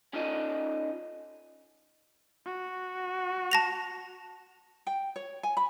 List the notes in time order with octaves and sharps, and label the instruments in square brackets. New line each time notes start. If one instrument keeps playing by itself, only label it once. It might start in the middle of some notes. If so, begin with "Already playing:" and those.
[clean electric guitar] C#4 D#4 F4 A4 D5 D#5
[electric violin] F#4
[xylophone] A5 A#6 F7
[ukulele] G5
C#5
G#5
B5